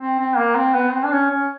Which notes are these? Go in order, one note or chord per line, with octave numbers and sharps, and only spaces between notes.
C4
C4
A#3
C4
B3
C4
D4
C#4
C#4